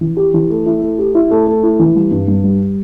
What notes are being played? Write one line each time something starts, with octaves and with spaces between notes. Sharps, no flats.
E3
G4
E3
A3
E4
A3
G4
E4
A3
A3
E4
E3
G3
G2
G2
G3